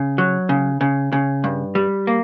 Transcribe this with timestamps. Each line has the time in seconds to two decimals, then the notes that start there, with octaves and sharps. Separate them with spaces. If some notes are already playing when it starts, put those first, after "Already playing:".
Already playing: C#3
0.18 F#3
0.49 C#3
0.81 C#3
1.12 C#3
1.44 G2
1.75 G3
2.07 A#3